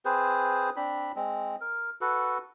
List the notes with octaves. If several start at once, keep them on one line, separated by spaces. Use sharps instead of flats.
C4 G#4 B4 C5
C4 D4 B5
G#3 C4
A#4
F#4 A4 B4